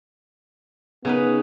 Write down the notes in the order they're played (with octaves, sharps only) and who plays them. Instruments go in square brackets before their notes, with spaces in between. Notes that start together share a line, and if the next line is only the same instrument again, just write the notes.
[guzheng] C#3 D#4 B4 [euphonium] B3